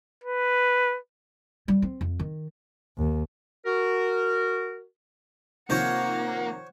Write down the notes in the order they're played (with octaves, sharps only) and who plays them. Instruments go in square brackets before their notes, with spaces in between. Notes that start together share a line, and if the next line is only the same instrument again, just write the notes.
[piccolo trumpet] B4
[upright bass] G3
C4
F2
D#3
[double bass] D#2
[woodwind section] F#4 A#4
[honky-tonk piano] C3 D#3 F3 [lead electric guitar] A#3 [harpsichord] C5 C#5 [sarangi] F#5